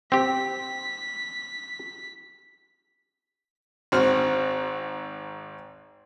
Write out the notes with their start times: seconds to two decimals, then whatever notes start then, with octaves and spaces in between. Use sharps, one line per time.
0.12 C4 G4 B6
3.92 G#1 C4 F#4 F6